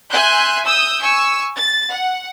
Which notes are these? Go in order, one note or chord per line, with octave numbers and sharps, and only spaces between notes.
E5 G#5 C6 F#6 G6
D#6 E6 G6
G#5 C#6 E6
A6
F#5